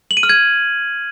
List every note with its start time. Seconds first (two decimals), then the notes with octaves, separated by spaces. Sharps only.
0.11 F#7
0.17 D#7
0.23 F6
0.29 G#6